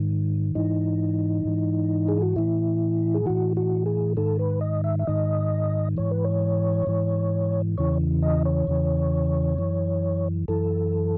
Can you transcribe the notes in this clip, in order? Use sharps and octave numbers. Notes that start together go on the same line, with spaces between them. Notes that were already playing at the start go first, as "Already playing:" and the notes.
Already playing: G#2 D#3
G#2 E3 D#4
G#2 E3
G#4
F#4
A2 E3 E4
G#4
A2 E3 F#4
F#4
G#4
G#2 D#3 A4
B4
D#5
E5
E5
G#2 D#3 D#5
G#2 E3 C#5
B4
C#5
G#2 E3
E2 C#3 E3 C#5
D#5
C#5
E2 C#3 E3
F#2 E3
F#2 E3 A4